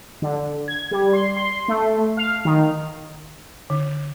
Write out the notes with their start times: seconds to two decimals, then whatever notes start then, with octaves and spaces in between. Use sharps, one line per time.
0.22 D3
0.68 G#6
0.91 G3
1.13 C6
1.37 C6
1.68 A3
2.17 F5
2.45 D#3
3.70 D3